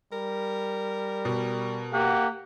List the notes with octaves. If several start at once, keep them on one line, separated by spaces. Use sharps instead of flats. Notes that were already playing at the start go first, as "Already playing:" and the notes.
G3 A#4
B2
A#3 G4 F#5